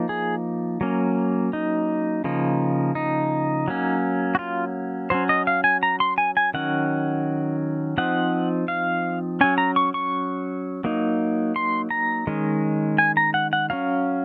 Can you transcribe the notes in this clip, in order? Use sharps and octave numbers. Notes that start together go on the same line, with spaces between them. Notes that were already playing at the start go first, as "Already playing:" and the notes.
Already playing: F3 A#3 D#4
G#4
F#3 A#3 C#4
D#4
C#3 F3 A#3 D#4
D#4
F#3 A#3 C#4
F#4
F4
F#3 C#4 C5
D#5
F5
G#5
A#5
C6
G#5
G#5
D#3 F#3 C#4 F#5
F3 C4 D#4 F#5
F5
F#3 C#4 G#5
A#5
C#6
C#6
F#3 A#3 D#4
C6
A#5
D#3 G#3 C#4
G#5
A#5
F#5
F#5
F#3 C#4 F5